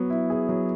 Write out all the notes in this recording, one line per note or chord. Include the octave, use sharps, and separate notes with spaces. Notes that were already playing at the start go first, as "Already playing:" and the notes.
Already playing: F#3 B3
E4
G#4
F#3